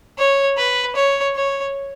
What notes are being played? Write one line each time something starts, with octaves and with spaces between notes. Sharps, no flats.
C#5
B4
C#5
C#5